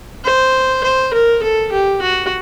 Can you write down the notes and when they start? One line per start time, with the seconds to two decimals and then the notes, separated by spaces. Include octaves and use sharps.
0.24 C5
0.84 C5
1.13 A#4
1.43 A4
1.72 G4
2.02 F#4